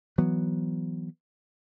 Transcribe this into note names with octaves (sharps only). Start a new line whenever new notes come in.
E3 F#3 B3